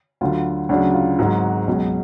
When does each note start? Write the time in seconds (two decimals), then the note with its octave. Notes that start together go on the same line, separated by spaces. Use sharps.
0.21 D2 D3 F#3 F4
0.69 D2 C#3 F#3 D4
0.94 F4
1.19 G#1 G#2 F#3 F#4
1.68 C#2 B2 F#3